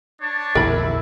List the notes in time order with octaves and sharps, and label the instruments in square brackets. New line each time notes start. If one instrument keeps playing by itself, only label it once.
[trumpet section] D4 C#5 A5
[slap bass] A#1 E2 D3 [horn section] E4 [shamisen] A#4 B5